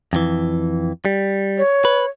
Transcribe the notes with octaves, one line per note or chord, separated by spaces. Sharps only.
F2 E3
G3
C#5
B4